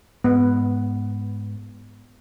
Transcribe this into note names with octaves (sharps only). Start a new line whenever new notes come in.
G#2 B3